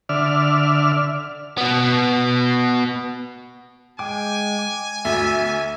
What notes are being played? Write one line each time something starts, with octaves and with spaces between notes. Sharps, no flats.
D3 D5 E5 F6
B2 B3
G#3 G5 G#5 D6
D6
D2 E5